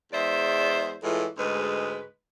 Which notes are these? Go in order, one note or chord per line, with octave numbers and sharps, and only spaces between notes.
E2 G#3 C5 D5 E5
A2 E3 G#3 F4
D2 G#2 G#3 B4